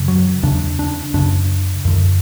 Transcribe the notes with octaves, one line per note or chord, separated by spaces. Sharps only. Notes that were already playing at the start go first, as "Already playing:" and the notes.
Already playing: F#2 C#3
F#3
E2 C#3 D4
D4
F#2 C#3 D4
F#2 D3